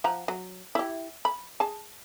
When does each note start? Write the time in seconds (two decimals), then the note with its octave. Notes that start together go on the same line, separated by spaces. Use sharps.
0.04 F3 F#5 A#5
0.28 F#3
0.75 E4 G4
1.25 B5
1.60 G#4 A5